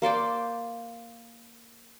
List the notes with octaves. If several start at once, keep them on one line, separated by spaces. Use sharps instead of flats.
A#3 C5 D5 G5